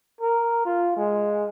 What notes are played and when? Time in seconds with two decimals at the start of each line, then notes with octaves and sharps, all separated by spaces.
0.21 A#4
0.65 F4
0.97 G#3